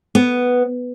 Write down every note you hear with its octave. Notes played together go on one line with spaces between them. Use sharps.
B3